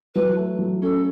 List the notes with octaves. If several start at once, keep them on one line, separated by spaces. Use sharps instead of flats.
F#3 B4
A3
F#3
C#4 A4